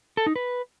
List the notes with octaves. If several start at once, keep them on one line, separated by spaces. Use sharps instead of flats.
A4
D#4
B4